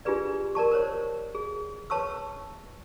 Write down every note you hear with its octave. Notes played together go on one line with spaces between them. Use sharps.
D4 F4 G4 G#4 B4 D5
A#4 D5 A5 C#6
A#4 C5 C#5
G#4
B4 C#5 A5 C#6 E6